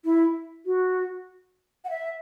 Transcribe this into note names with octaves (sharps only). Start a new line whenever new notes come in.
E4
F#4
F#5
E5